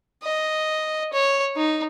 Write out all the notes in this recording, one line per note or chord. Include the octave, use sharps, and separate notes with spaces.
D#5
C#5
D#4